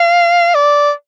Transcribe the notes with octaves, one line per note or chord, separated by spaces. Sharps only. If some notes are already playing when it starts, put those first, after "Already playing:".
Already playing: F5
D5